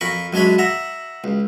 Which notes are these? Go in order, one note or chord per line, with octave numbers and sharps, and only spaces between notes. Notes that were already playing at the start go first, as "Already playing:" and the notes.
F2 A#4 B5 C#6
F#2 G#3 D4 C#5 B5
E5 F#5 A#5
C#2